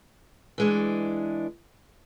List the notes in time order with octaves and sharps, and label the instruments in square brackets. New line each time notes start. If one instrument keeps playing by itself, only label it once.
[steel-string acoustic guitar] E3 G#3 D4